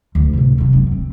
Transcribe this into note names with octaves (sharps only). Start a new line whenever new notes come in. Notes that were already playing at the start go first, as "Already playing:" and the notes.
D2
A1 C3
C3 F#3
F#1 B3
C4